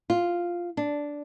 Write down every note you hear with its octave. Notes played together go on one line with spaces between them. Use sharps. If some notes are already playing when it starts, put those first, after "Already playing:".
F4
D4